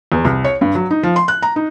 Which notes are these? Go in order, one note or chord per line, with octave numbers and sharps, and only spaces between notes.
E2
C2
C#5
G2
F#3
D#4
F3
C6
F#6
A#5
D#4